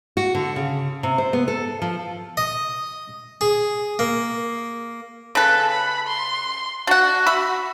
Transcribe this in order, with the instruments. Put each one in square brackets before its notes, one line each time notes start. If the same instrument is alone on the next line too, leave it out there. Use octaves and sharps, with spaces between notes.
[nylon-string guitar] F#4
D3
C#3
C3
C5
B3
A4
F3
[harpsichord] D#5
G#4
A#3
[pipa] C#3 B4 [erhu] A4
[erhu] B5
C6
[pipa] D4 F#5 [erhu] F#4
[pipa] E5 B5